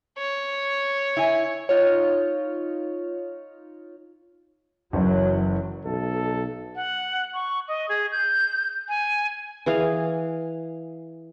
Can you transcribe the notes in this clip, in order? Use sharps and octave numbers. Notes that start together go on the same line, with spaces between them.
C#5
E4 G#5
D#4 F4 C#5
F#1 E3 F#3 C#4
B1 A4
F#5
C#6
D#5
G#4
G6
G#5
E3 G#4 F5